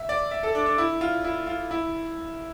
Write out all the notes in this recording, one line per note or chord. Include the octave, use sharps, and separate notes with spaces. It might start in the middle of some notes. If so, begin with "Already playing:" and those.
Already playing: E5
D5
E5
A4
D4
D4
E4
F4
E4
F4
E4